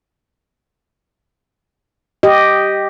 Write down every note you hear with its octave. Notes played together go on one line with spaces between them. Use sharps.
G4 D#5